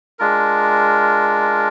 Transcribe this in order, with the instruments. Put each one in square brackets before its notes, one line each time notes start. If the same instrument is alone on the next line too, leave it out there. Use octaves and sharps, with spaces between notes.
[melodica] G#3 D4 F4 A#4